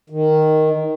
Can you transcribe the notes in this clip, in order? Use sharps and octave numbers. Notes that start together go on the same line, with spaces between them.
D#3